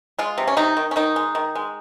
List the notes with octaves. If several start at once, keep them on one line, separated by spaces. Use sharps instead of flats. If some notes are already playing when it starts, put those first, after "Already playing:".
G#3 F4
C3
C#4
C3 D#4
D#3
C#4
D#3 D#4
G#3
D#3
G#3